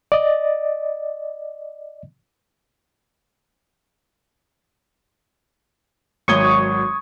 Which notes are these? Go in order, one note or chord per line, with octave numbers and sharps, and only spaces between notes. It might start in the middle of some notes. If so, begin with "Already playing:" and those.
D5 D#5
G#1 F#3 C#6 D#6 G#6 G7